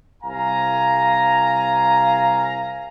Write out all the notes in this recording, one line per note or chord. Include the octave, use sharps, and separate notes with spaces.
C2 F5 G#5 A#5